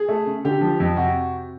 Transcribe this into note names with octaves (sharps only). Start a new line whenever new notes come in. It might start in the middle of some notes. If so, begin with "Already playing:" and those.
Already playing: G#4
A3
C#3
D3 G4
F3
F2
C3 F#4